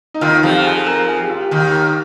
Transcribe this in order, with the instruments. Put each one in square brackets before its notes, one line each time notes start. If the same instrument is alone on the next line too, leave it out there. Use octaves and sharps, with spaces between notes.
[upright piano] D#4
[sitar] D#2 D#3 [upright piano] F4
[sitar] F2 F3 [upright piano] G4
[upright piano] G#4
G#4
A#4
G#4
G4
F4
G4
[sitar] D#2 D#3